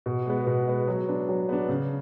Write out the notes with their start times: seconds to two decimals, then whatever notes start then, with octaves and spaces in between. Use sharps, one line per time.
0.06 B2
0.27 G#3 B3
0.47 B2
0.68 G#3 B3
0.88 F#3
1.09 B3 D4
1.29 F#3
1.49 B3 D4
1.69 C#3